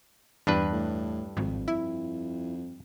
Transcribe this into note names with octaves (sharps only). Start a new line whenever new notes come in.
E2 G2 D4 B4
A2
G#1 F2
E4